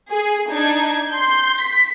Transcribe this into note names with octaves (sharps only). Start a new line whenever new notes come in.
G#4
D4 D#4 G#6
C6 G6
B6